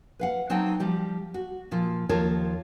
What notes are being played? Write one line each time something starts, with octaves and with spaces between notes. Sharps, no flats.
B4 F5 F#5
F#3 C4 D#4 F#5 G5 A5
F3 G3 G4
F#4
A#2 F3 F4
D#2 F3 F4 A#4 C#5 A5